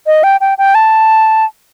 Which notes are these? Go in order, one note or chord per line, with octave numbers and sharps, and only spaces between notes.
D#5
G5
G5
G5
A5